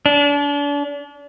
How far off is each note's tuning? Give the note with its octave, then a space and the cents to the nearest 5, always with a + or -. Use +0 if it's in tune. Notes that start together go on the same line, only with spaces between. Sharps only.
D4 -35